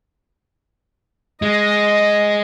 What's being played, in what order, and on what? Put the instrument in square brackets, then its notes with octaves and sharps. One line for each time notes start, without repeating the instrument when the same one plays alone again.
[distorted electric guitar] G#3 [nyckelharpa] D#5